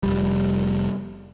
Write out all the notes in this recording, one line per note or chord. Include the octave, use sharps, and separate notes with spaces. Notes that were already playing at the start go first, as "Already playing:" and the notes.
F1 D#2 G3